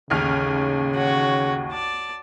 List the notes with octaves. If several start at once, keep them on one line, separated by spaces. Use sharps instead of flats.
A1 D#2 C#3 F6
F#4 C#5
D5 A5